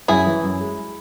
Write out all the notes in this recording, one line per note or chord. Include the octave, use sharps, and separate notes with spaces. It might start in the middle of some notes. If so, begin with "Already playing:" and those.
F#2 E4 G#4
E3
F#2
G#3